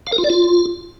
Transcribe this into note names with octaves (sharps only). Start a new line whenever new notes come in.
F5
A#4
F4
D5
F4